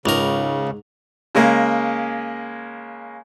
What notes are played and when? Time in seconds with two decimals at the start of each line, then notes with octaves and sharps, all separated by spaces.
0.06 C#2 G#2 C#3 A#4 F7
1.35 C#3 G#3 A#3